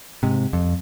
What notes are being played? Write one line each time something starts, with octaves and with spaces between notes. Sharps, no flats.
G#2 C3
F2